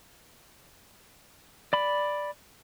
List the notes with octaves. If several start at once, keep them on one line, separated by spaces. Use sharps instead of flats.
D5 B5